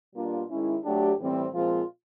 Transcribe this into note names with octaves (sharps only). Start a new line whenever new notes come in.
B2 G3 A#3 D4 F4
D#3 G#3 C#4 E4
F#3 A3 D4 G4
A2 E3 G3 C4
A#2 F3 G#3 C4 F4